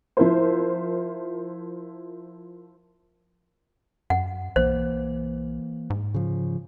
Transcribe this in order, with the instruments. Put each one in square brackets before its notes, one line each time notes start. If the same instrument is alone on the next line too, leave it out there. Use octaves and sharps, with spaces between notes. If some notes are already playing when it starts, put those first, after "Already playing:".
[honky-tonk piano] F3 E4 A#4 C5
[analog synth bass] F#2 [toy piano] F#5
[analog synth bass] B1 [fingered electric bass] E3 A#3 [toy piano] C5
[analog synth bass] G#2
[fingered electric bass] C#3 F3